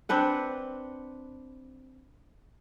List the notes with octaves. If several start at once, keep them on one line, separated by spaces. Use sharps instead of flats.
C4 D4 B4 F#5